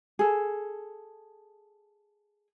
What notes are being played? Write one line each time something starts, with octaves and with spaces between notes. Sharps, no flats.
G#4 A4